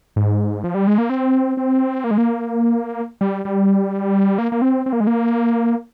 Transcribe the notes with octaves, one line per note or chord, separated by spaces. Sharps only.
G#2
F3
G3
G#3
A#3
C4
C4
A#3
G#3
A#3
G3
G3
A#3
A#3
C4
C4
A#3
G#3
A#3